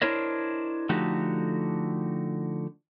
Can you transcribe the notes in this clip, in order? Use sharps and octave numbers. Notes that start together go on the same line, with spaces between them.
D4 E4 A#4 C5 C#5 D#5
D3 F3 A3 D#4 F#4 G4